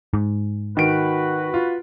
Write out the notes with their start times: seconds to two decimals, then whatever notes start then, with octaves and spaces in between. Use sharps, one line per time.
0.14 G#2
0.77 D#3 F#4 B4 D7
1.54 F4